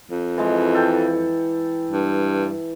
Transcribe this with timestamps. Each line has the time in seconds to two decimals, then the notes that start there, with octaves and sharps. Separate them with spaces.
0.11 F2
0.38 E3 G#3
0.75 A4 G5
1.91 G2